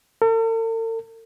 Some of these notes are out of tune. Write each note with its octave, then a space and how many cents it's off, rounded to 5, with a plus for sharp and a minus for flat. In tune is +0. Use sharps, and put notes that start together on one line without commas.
A4 +45